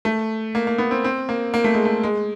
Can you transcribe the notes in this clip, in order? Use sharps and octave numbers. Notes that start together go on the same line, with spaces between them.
A3
A#3
A#3
B3
C4
C4
A#3
A#3
A3
G#3
A3
G#3